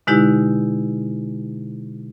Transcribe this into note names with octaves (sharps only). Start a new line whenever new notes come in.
B2 D3 G#3 D#4 E4 G4